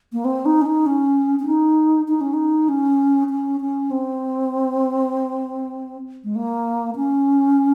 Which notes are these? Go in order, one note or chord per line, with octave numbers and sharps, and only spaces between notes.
A#3
C4
D#4
C#4
D#4
C#4
C#4
D#4
D#4
C#4
D#4
C#4
C#4
C#4
C4
G#3
A#3
C#4